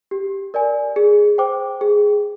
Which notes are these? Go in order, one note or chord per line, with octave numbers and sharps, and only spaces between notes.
G4
A#4 D5 G#5
G#4
C5 G5 D6
G#4